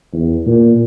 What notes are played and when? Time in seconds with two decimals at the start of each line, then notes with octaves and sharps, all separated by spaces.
0.13 E2
0.46 A#2